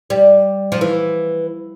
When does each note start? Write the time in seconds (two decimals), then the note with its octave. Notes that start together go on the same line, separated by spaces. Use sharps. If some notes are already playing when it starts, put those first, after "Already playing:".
0.10 G3
0.72 F3
0.81 E3